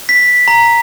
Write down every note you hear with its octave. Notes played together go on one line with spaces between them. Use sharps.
B6
A#5